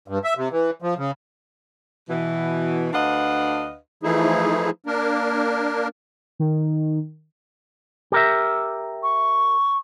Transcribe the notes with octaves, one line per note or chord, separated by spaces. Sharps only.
G2
E5
C3
E3
F3
C#3
B2 E3
D2 D4 B4 D#5 F5 F#5
E3 F3 A3 D#4 E4 G#4
A#3 D4 A#4
D#3
G4 A#4 E5
C#6